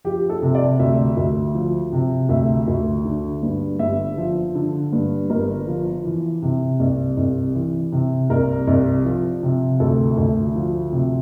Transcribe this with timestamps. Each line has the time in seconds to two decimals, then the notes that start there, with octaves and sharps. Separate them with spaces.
0.04 F3 G4
0.30 A4
0.42 C3
0.55 D5
0.80 D2 E5
1.17 D2
1.54 F3
1.93 C3
2.29 D2 E5
2.68 D2
3.05 D3
3.42 G2
3.79 G1 E5
4.18 F3
4.55 D3
4.92 G2
5.30 G1 A#4
5.67 F3
6.05 E3
6.42 C3
6.80 C2
7.17 C2
7.55 E3
7.92 C3
8.30 C2 A#4
8.67 C2
9.05 F3
9.43 C3
9.80 D2 A4
10.17 D2
10.55 F3
10.93 C3